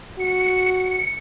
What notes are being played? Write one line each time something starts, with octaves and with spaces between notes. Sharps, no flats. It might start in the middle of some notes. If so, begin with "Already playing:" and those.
F#4 C#7